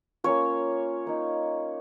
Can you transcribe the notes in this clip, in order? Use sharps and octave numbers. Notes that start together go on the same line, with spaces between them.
A#3 C#4 F4 C#5
A#3 D#4